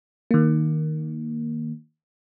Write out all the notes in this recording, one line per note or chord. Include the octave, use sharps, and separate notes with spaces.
D#3 A#3